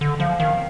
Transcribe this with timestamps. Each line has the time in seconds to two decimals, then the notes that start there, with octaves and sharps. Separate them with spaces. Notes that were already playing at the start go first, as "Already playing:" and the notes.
0.01 D3
0.20 F3 F5
0.39 D#3 F5